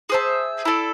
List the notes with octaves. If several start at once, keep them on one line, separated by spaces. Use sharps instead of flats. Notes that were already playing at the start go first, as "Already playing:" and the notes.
G#4 C5 E5 A5
E4 A4 D5